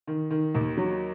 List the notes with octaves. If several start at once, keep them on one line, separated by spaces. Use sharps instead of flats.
D#3
D#3
D#2
F#3